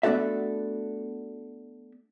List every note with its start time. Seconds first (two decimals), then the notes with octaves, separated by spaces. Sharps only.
0.03 A3 B3 D4 F#4 A4 E5